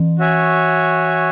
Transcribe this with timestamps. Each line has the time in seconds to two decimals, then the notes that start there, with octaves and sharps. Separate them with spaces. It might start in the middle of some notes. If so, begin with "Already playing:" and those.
Already playing: E3
0.19 F#4 C#5 E5 G#5